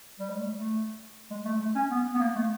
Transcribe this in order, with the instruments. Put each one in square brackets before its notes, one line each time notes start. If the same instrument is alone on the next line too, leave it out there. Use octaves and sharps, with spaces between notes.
[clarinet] G3
G#3
A3
A3
G#3
A3
G#3
A3
C#4
B3
B3
A#3
A3